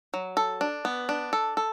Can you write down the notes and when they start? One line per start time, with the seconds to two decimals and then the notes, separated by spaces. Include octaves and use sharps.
0.14 F#3
0.37 A4
0.61 D4
0.85 B3
1.09 D4
1.33 A4
1.57 A4